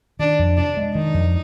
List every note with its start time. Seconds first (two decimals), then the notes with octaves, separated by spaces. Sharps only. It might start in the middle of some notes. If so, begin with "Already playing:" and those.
0.19 D#3 D4
0.39 F2
0.57 C3 D4
0.77 G#3
0.95 D#3 D#4
1.14 F2